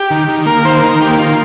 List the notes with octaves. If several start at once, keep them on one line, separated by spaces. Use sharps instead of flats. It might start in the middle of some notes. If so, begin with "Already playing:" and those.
Already playing: G4
D#3
D#3
A#3 A#4
D#3 C5
D#3 A#4
A#3 G4
D#3 F4